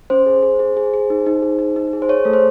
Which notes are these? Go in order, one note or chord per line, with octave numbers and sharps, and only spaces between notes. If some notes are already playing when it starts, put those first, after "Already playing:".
C#4 C5
G#4
G#4
G#4
G#4
G#4
D#4
D#4
G#4
D#4
D#4
G#4
C5
G#4 C#5
A3 A4
C5